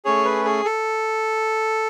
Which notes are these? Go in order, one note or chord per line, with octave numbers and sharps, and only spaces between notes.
A3 C#4 G#4 C#5
B4
G#4
A4